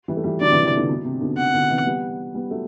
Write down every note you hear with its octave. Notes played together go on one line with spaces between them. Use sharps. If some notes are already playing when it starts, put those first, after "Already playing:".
E3 G3
A3
E3 G3
D3 F#3 D5
C3 E3
C3 E3
B2 D3
B2
C3
B2 D3
C3 F#5
B2 D3
C3 E3
G3 B3
G3 B3
F#3 A3